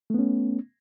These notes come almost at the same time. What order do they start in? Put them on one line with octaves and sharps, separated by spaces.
A3 B3 C#4